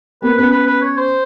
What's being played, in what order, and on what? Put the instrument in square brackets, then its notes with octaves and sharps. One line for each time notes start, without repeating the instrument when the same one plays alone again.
[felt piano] A#3 C4 [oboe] B4
[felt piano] B3 C#4 [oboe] B4
[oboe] B4
B4
C#5
C5